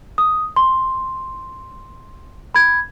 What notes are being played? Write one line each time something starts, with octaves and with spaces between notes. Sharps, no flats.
D#6
C6
B5 G#6